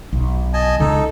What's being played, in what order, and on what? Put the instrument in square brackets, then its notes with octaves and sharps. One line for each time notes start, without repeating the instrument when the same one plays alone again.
[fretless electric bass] B1
[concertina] D#5 G#5 A5
[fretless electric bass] C#2 [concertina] D#4 A4